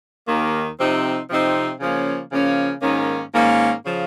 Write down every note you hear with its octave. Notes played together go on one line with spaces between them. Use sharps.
D#2 D#3 A#3
C3 F3 C4 D#4
C3 F3 C4 D#4
C#3 F3 A#3 C#4
C#3 F3 A#3 C#4
G#2 D#3 A#3 C#4
G#2 D#3 A#3 C#4
C#3 F3